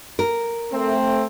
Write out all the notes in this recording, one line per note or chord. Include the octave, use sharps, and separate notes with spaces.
A#4
A3 C4